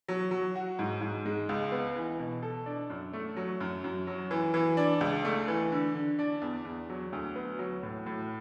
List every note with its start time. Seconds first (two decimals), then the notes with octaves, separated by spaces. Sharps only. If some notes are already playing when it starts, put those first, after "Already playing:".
0.08 F#3
0.31 F#3
0.55 F#4
0.79 G#2
1.02 G#2
1.26 G#3
1.49 C#2
1.72 B3
1.96 E3
2.19 B2
2.43 A4
2.66 D4
2.90 F#2
3.13 A3
3.37 F#3
3.60 F#2
3.84 F#2
4.07 F#3
4.31 E3
4.54 E3
4.77 D4
5.01 C#2
5.25 A3
5.48 E3
5.72 D3
5.95 D3
6.19 D4
6.42 E2
6.65 E2
6.90 F#3
7.13 D2
7.36 B3
7.59 F#3
7.83 A2
8.06 A2